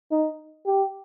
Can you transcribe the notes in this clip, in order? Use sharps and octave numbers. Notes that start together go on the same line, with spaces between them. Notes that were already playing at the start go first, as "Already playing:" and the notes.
D#4
G4